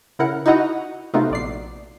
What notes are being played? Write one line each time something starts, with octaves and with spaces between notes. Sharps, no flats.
C#3 E4 A#4 F#5 F#6
D#4 E4 F#4 D#5 F#5 A#5
C3 A3 B3 D#4 F4 F#4
A#1 D5 C7